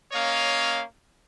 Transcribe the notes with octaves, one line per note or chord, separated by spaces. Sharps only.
A#3 C#4 C#5 D#5 F5